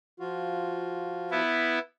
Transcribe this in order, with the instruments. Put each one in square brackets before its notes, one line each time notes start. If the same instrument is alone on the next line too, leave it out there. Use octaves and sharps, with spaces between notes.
[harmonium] F3 F4 F#4
[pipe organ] B3 E4